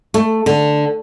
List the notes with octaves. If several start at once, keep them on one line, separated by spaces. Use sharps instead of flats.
A3
D3